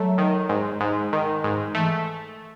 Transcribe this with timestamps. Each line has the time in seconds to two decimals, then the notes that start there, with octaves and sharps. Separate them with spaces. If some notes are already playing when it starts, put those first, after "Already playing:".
Already playing: F#3 A3
0.18 D#3
0.49 G#2
0.81 G#2
1.13 D#3
1.44 G#2
1.75 E3 A3